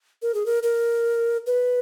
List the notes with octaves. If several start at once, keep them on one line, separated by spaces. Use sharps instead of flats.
A#4
G#4
A#4
A#4
B4